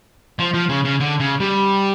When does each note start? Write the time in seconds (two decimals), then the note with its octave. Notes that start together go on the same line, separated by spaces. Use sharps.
0.39 F3
0.54 F3
0.69 C#3
0.85 C#3
1.00 D3
1.20 C#3
1.40 G3